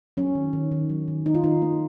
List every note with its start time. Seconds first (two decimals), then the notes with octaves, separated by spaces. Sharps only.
0.17 F#3 C#4
0.35 D#3
0.53 D#3
0.72 D#3
0.90 F#3
1.08 D#3
1.26 D#3 D#4
1.35 F4
1.44 D#3 D#4
1.62 A#3